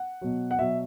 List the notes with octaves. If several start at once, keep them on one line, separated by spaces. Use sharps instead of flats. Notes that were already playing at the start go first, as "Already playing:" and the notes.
Already playing: F#5
B2 F#3
F#5
B2 F#3 E5